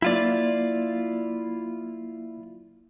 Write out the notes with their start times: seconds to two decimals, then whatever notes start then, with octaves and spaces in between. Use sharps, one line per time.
0.02 F#3 A#3 E4 F4 D5